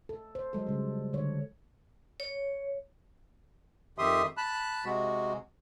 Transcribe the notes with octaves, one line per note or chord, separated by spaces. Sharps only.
A4
C5
F#3 G#3 A4
C#3 G3
D3 C#5
C#5
F2 D#3 G4 E5 C6 D#6
A5 B5 F#6
C3 G#3 F#4